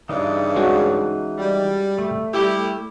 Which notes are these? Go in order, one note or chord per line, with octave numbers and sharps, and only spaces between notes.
G2 C#3 E3 D#4
G#3 C#4 F#4
G3
A3
G3 E4 G4